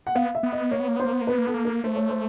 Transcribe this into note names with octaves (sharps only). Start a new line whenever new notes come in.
F#5
B3 F5
E5
B3
D#5
A#3 C#5
B3
A#3
B3 C5
A#3
B3
A#3
B3 B4
A#3
B3 A4
A#3
A#4
A3 C5
C#5
C5